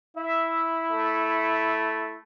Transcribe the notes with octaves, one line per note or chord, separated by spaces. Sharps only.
E4 E5
A3